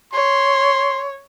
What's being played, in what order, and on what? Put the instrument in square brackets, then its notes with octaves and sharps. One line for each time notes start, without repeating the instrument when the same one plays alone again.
[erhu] C#5 [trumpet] C6